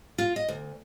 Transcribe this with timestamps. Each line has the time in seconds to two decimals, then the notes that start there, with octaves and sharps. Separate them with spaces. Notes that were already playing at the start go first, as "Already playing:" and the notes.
0.18 F4
0.36 D#5
0.48 D2